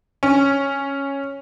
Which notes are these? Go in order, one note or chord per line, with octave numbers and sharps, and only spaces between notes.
C#4